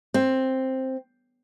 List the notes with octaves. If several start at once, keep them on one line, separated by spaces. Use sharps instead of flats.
C4